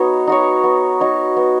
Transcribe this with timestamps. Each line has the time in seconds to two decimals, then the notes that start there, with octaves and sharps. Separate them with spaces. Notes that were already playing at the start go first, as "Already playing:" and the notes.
Already playing: B3 D#4 F#4 C#5
0.27 D#4 F#4 C#5
0.64 B3
1.00 D#4 F#4 C#5
1.37 B3